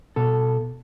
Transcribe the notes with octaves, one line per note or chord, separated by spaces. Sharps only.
B2 A4